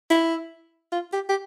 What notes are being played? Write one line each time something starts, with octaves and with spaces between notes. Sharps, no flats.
E4
F4
G4
G4